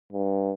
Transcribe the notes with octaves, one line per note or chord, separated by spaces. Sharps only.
G2